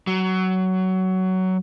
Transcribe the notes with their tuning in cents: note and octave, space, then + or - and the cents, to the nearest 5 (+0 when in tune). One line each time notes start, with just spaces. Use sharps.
F#3 +15